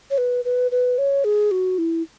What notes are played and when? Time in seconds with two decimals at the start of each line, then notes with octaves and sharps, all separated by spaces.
0.11 C#5
0.18 B4
0.45 B4
0.71 B4
0.98 C#5
1.24 G#4
1.51 F#4
1.78 E4